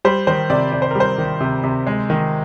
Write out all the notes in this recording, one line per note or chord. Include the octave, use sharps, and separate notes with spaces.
G3 C5
D#3 C5
C3 D5
C3 D5
C5
A#4
G3 C5
D#3
C3
C3
G#3
D#3